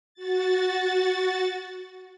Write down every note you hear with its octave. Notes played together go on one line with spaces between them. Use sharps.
F#4 A6